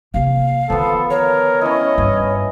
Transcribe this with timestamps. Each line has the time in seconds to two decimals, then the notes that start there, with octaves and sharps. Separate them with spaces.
0.14 C3 A#3 F5
0.70 D3 D#3 F3 B3 A4
1.10 A#4 C#5
1.61 C#4 E4 D#5
1.98 G2